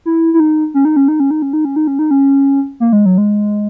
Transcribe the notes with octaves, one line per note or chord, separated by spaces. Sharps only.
E4
E4
D#4
C#4
D#4
C#4
D#4
C#4
D#4
C#4
D#4
C#4
D#4
C#4
D#4
C#4
A#3
G#3
F#3
G#3